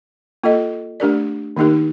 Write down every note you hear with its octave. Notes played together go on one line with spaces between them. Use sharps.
A#3 F4 A4 D#5
A3 D4 G4 A#4 D5
D#3 A#3 D#4 G4 A#4